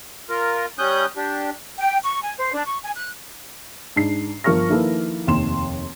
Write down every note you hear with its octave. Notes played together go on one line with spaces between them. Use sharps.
F4 A#4
G3 C#4 D#6 F#6 G6
D4 G4
G5
C#6
G#5
C5
D4
C#6
G#5
F#6
G#2 D4 C7
G1 F3 A#4 C#6 F6 A#6
D#3 F3 A#3 E4 A4 B4
F1 D#2 C6 E7